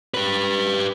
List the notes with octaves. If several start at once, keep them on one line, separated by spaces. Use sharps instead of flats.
G4 B4